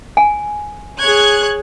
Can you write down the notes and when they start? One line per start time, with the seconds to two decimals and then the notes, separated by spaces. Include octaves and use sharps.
0.17 G#5
1.00 G#4 C#5 F#6 G#6